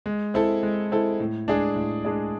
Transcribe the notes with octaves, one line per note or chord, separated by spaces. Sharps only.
G#3
C4 E4 A4
G#3
C4 E4 A4
A2
G#3 D4 G#4 D5
A2
G#3 D4 G#4 D5